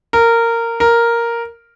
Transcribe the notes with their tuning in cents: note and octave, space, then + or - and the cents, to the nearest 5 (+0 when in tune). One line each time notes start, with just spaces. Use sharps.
A#4 -15
A#4 +0